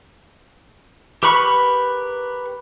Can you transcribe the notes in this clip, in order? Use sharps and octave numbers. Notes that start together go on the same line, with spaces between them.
G4 A#4 B4 B5 C#6